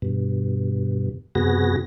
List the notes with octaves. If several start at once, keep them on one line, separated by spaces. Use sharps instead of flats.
G2 B2
F#2 C3 B3 F#4 G#4 A#6